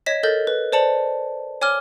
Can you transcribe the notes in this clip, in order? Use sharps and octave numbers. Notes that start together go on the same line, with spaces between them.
C#5 D#5 G#6 B6 E7
A4 A#4 D#5 G6 A6
B4
C5 D5 A5 C#7 F#7
C#5 G#5 D6 F6 G7